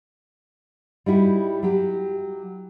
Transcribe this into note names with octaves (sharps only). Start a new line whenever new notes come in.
G3 D#4 E4 F#4
F#3 G4